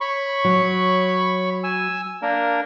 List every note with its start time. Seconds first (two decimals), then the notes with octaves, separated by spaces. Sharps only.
0.01 C#5 B5 C#6
0.45 F#3
1.64 G#5 E6
2.22 A#3 D4 A#4